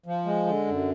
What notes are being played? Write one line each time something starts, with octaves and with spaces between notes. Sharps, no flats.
F3
G#3
D3
F#2